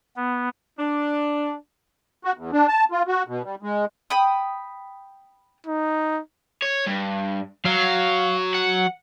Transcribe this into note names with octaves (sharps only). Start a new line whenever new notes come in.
B3
D4
F#4
E2
D4
A5
F4
F#4
B2
G3
G#3
G5 B5 D#6
D#4
C#5
G2
F#3 F5
F#5